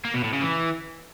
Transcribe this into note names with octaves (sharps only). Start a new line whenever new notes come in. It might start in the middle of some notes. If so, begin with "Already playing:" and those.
A#3
B2
A2
C#3
E3